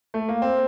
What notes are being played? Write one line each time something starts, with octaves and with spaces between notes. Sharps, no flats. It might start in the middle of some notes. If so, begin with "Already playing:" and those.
A3
A#3
C4